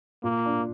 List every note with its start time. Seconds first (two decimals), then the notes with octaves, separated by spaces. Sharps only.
0.23 A#2 A#3
0.46 D4